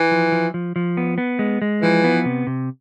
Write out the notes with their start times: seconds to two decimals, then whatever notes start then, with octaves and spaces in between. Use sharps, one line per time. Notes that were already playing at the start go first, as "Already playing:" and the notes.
Already playing: E3
0.11 F3
0.32 F3
0.54 F3
0.76 F3
0.97 B3
1.18 B3
1.39 G#3
1.62 G#3
1.82 E3 F3
2.04 B3
2.25 C3
2.47 C3